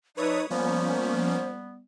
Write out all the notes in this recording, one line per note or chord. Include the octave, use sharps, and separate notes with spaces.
F3 D#4 B4 C#5 D5 E5 D#6
F3 G3 A#3 B3 C#4 C5